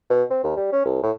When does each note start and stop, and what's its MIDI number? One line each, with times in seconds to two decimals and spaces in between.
0.10 0.23 47
0.30 0.40 60
0.44 0.57 39
0.57 0.68 55
0.72 0.82 61
0.85 0.98 36
1.03 1.11 45